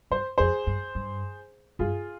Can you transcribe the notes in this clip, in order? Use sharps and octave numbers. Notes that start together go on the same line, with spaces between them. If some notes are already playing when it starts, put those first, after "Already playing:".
G2 C5
F2 G#4 C5
G2
G2
G2 F4 G#4